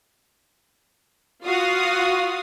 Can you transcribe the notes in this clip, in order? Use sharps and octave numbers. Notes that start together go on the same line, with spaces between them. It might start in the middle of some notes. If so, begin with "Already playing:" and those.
F4 F#4 F5 D#6